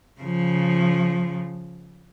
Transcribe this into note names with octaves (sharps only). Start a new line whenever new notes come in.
C#3 F3